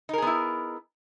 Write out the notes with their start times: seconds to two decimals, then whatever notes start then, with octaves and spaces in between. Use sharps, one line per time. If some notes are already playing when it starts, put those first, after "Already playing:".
0.09 D#4
0.13 A#4
0.18 G#4
0.22 B3
0.27 E4